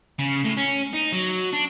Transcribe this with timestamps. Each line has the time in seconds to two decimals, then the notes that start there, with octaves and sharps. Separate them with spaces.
0.19 C#3
0.45 A2
0.57 C#4
0.93 D#4
1.12 F#3
1.53 D4